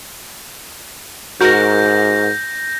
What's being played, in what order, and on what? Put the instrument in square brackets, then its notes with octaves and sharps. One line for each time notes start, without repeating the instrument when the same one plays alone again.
[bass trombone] G#2 [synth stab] F#4 A#4 [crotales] G6 A#6